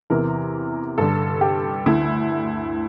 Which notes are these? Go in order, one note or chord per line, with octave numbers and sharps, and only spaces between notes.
E2 C3 E3 A#4
G2 D3 A4
G4
D2 D3 E4